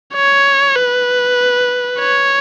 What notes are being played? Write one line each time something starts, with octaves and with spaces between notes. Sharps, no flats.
C#5
B4
C#5